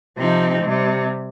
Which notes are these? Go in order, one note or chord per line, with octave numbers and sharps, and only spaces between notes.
C3 F3 C4 D#4
C3 G3